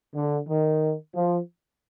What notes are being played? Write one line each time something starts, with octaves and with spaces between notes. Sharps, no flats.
D3
D#3
F3